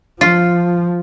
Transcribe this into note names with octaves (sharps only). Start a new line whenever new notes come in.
F3 F4